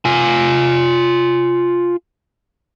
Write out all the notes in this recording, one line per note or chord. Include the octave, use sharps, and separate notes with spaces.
F4 G#5